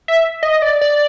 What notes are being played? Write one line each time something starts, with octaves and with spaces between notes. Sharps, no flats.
E5
D#5
D5
D5